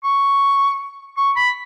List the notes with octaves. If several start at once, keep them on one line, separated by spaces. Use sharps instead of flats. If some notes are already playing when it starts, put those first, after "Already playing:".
C#6
C#6
B5